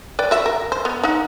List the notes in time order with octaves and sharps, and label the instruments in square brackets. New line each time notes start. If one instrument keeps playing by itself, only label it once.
[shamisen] B4 D5 G5
F#4 E5
A#4
C5
B3
D#4 F#5